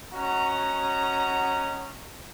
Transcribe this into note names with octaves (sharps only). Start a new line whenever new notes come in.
C#4 F#4 D#5 F#5 A#5